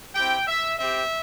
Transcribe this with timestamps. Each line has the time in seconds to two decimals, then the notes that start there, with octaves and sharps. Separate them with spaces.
0.15 C4 E4 G4 G5
0.47 E5
0.79 C4 G4 E5